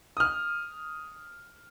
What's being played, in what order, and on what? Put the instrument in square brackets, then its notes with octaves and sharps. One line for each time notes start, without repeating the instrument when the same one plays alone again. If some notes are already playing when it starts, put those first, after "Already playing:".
[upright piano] D#6 F6